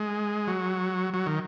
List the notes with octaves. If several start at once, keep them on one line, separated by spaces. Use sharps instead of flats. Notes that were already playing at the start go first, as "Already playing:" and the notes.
Already playing: G#3
F#3
F#3
D#3